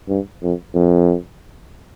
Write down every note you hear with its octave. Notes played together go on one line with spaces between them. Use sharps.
G2
F2
F2